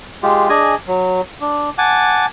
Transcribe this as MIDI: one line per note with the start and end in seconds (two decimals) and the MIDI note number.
0.23 0.49 56
0.23 0.49 65
0.23 0.49 67
0.49 0.75 62
0.49 0.75 68
0.49 0.75 75
0.49 0.75 80
0.87 1.21 54
1.41 1.70 62
1.78 2.26 78
1.78 2.26 80
1.78 2.26 81
1.78 2.26 86